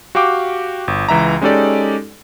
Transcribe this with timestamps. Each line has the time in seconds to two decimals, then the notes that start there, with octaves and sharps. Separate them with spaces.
0.15 F#4 G4 F5 G5 D6
0.88 G1
1.08 C#2 E3 E5 A#5
1.41 G#3 C#4 D#4 G4 A4 D5